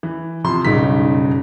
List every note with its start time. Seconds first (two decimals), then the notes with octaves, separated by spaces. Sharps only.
0.03 E3
0.44 C3 F3 C6
0.65 F#1 B1 G2 C#3 D#4 B6